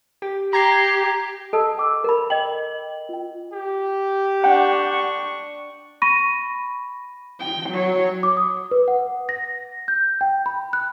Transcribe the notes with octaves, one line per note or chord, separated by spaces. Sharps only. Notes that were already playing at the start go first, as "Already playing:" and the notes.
G4
G4 A#5 G#6 C7
A4 D#5 A5 E6
G5 D6 E6
A#4 B5
D#5 G5 F#7
F4 G5
G4
D4 F#5 G5 C#6
B5 C#6 A#6 D#7
G5
F#3 C#5
D6
D#6
B4
F#5
A#6
G6
G5
B5
F#6